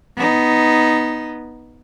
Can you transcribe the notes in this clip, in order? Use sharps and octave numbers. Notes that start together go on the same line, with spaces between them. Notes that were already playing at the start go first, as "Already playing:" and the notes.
B3 D#4